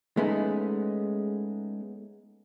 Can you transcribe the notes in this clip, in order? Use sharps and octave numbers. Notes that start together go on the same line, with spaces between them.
G#3 A3 B3 C#4 D#4